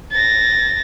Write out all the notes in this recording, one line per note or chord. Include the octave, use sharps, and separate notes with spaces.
A6 A#6